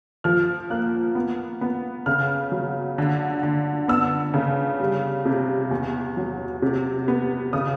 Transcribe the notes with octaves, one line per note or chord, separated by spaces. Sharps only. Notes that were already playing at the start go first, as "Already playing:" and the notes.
F3 F6
A#3 F#6
B3
B3
C#3 F6
F#3
D3
D3
B3 E6
C#3
G3
C3
E2
F#3
C3
B3
C#3 D#6